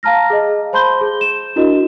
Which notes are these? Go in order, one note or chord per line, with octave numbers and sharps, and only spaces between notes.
F5 A5 A#5 F6 A#6
G#4 D#5
C5 A5 B5 C6 G6 G7
G#4
E7
D4 E4 F#4 A#4 D#5